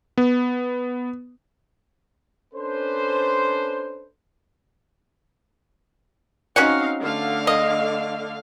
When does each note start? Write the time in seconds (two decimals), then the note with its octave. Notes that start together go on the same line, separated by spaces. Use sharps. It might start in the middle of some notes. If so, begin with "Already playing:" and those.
0.18 B3
2.54 C#4 D4 A4 B4 C5
6.56 C4 C#4 D#4 F#4 F5 F#5
7.02 D3 A3 F5
7.47 D#5